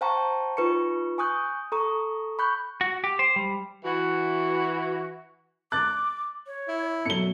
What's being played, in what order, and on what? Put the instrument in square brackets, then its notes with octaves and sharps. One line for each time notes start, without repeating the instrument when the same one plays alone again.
[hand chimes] C5 F5 G5 A5 A#5 C#6
D#4 F4 B4 C#6 C#7
G#5 C#6 D#6 F#6 G6
A4 A#5 C#6 D#6
B5 C#6 F#6 G6
[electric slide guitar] F#4
G4
C5
G3
[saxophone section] E3 F#4
[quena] D6 [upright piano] F#6 A6
[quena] C#5
[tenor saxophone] E4
[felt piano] B2 F#3 [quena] A4 [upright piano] C#7 G7